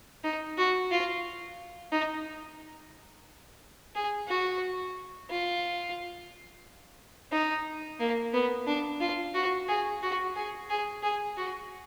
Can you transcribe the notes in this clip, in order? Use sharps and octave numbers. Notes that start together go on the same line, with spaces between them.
D#4
F#4
F4
D#4
G#4
F#4
F4
D#4
A#3
B3
D4
F4
F#4
G#4
F#4
G#4
G#4
G#4
F#4